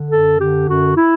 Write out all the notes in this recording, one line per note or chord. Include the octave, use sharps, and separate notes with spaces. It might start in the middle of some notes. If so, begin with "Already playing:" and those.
Already playing: D3
F#2 A4
D3 G4
F#2 F#4
E4